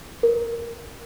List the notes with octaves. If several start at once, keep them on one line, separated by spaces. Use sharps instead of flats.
A#4